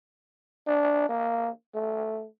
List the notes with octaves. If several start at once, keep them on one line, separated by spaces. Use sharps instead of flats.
D4
A#3
A3